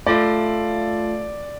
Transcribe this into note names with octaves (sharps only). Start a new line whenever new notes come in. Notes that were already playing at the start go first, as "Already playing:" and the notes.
A3 F4 A4 D5 F5 A5